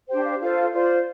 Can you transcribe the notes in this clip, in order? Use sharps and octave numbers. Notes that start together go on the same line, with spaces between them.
D4 G4 C5 G5
F5
F4 A4 C5 F5
F4 C5 D5